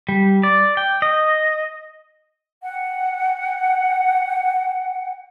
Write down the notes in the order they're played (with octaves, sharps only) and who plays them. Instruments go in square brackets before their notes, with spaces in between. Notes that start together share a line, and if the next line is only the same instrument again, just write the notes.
[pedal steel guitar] G3
D5
G5
D#5
[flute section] F#5 G5